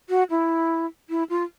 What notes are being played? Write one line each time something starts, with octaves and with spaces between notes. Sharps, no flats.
F#4
E4
E4
F4